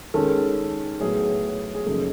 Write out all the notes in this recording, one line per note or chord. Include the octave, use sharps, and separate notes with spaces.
D#3 G#3 C#4 A4
A2 F#3 B3 G#4
G#4
F#2 C#3 F3 A#3 D#4 A4